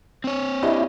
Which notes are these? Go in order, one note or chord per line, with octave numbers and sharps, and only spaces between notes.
C4 C#5
D4 E4 G4 D#5